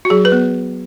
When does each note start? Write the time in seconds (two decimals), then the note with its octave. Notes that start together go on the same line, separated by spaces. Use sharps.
0.05 F#4
0.10 F#3 G#4
0.25 B4
0.32 B3